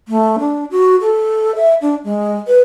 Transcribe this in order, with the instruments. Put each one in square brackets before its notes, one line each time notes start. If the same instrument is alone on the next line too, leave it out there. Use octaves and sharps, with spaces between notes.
[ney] A3
D4
F#4
A4
E5
D4
G#3
B4